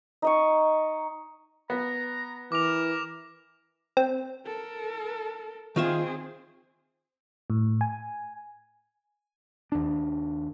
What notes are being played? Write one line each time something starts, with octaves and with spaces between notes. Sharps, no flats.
D#4 D#5 C#6
B3 A#5
E3 A#4 D6 F7
C4
A4 A#4
D#3 C4 F4 G#4 E5
A2
G#5
D#2 D4